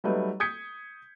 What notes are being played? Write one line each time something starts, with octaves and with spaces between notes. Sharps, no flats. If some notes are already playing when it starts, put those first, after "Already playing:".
F#3 G3 A3 D#4 B4
D#6 G6 G#6 B6 C#7